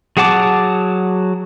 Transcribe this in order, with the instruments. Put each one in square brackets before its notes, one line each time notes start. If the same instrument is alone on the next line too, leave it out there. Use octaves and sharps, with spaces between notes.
[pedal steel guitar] F#3 G#4 F#5 A5 D6